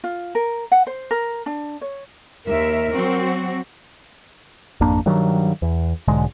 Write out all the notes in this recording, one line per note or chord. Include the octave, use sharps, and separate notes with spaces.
F4
A#4
F#5
C5
A#4
D4
C#5
D#2 A#4 E5
F#3 C4 F#4
G#1 F2 A#3 D4
G2 D#3 F#3
E2
B1 G#2 D3 G#3